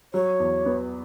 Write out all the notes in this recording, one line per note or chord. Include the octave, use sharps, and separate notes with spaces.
F#3 C#5
E2
B3